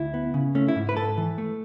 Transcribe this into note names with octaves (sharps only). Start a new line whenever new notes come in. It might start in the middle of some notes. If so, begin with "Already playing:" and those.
Already playing: D2 E4
B3
C#3
A3 C#4
E4
G#2
B4
G#2 A4
E3
A3